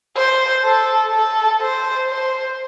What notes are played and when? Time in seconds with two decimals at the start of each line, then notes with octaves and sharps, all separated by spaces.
0.16 C5
0.65 A4
1.13 A4
1.61 C5
2.10 C5